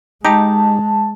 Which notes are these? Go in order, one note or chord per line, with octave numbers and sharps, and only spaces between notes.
G#3 D#4 G4 A5 A#5